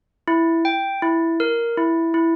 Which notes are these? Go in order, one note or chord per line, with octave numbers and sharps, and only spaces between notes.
E4
G5
E4
A#4
E4
E4